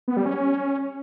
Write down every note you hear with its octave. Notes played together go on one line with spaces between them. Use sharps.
B3
G3
C#4